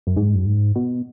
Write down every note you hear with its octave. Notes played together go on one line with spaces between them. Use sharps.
F#2
G#2
F#2
G#2
B2